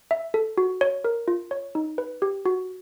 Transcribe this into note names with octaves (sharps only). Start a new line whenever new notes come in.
E5
A4
F#4
C#5
A#4
F4
C#5
D#4
B4
G4
F#4